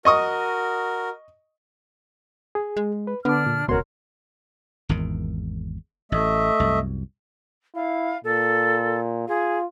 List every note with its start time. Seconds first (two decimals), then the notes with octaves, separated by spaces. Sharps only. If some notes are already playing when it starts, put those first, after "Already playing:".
0.05 F#4 A#4 D#5 C#6 D#6
2.55 G#4
2.77 G#3
3.07 B4
3.25 D3 B3 D4 D6 F6
3.46 A#2
3.68 D#1 C#2 B2 F#4 A#4 C#5 C6
4.89 G#1 E2 D#3
6.12 A1 A3 D#5 E5
6.60 C2 F#2
7.75 E4 F5
8.24 A#2 A4
9.28 F4 G#4